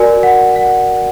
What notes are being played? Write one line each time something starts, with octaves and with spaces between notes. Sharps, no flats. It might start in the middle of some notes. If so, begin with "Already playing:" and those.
Already playing: F#4 A#4 D5 G#5
F#5
F#5